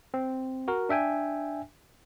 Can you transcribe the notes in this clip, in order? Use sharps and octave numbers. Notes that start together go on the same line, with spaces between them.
C4
F#4 A#4
D4 E5 G5 G#5